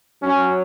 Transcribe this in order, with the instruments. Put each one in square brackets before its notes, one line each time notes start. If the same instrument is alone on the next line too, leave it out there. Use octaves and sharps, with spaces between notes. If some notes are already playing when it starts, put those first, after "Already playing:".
[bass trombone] F#3 [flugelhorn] C#4